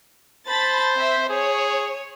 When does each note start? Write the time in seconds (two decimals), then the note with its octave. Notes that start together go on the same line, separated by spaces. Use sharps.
0.48 C5 A5 B5 A6
0.94 C4 E5
1.30 G#4 C#5